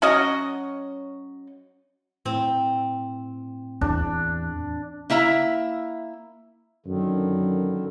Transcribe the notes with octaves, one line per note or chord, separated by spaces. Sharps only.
F#3 C#4 F#4 D#5
A2 C4
E2 D4
A#3 E4 E5 A#5
F#2 D3 D#3